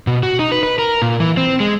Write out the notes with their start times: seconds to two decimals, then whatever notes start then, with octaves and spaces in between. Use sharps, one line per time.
0.07 B2
0.23 F#4
0.39 D#4
0.52 B4
0.63 B4
0.78 A#4
1.02 A#2
1.20 E3
1.37 C4
1.60 G#3